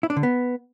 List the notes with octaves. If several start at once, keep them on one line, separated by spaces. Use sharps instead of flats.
E4
D4
D3
B3